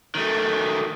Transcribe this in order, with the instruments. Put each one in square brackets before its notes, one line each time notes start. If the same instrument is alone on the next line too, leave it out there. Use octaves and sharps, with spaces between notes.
[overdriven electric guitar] D#3 A3